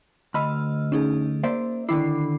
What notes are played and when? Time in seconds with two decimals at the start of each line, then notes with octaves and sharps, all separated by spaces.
0.34 D2 D#5 B5 E6 F6
0.92 C#4 D#4 G#4
1.43 A#3 C5 D5 E5
1.89 D3 D#3 E4 B5 D6 C7